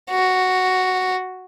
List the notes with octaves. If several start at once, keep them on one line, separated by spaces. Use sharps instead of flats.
F#4